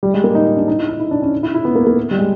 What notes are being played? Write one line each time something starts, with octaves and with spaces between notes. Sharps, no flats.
G3
G#3
A#3
D#4
D#4
D4
D#4
E4
D#4
E4
D4
C#4
E4
E4
B3
A#3
A#3
G3
G#3